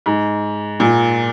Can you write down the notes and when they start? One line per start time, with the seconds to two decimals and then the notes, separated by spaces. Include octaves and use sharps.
0.06 G#2
0.80 A#2